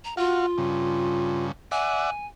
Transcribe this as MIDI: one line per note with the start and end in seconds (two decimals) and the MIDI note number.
0.04 0.14 82
0.17 1.46 65
0.17 0.46 66
0.17 0.46 77
0.58 1.52 43
0.58 1.52 49
1.72 2.10 74
1.72 2.10 76
1.72 2.10 78
1.72 2.26 80